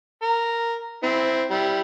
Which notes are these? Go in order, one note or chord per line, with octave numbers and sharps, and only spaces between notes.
A#4
C4 E4
G3 E4